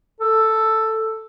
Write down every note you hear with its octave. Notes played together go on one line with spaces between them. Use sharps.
A4